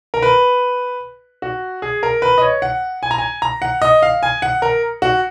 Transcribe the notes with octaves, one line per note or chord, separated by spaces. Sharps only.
A#4
B4
F#4
G#4
A#4
B4
D#5
C#5
F#5
G#5
A#5
G#5
A#5
F#5
D#5
F5
G#5
F#5
A#4
F#4